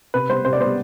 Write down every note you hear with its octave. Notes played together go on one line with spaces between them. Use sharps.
C3 B4
G3 B3 C5
C3 C5
D5
G3 B3 C5